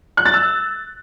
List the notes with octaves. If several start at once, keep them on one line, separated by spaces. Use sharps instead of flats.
F#6
A6
E6